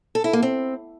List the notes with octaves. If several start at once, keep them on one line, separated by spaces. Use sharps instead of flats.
A4
E4
A#3
C4